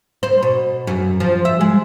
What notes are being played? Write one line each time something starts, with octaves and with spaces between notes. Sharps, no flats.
C5
B2
F#2
F3
E5
G#3